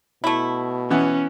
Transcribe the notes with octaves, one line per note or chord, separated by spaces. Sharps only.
B2 A3 E4
E3 B3 C#4